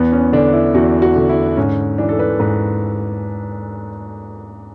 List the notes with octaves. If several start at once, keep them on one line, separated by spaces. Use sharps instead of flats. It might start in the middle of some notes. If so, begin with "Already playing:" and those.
Already playing: E2 B3
C#4
D3 D4
E4
E2 F#4
F#4
D3
E4
G#2 C#4
E3 D4
A4
B4
G#2 B4